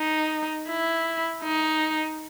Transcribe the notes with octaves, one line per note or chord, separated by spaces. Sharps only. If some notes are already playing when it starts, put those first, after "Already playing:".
Already playing: D#4
E4
D#4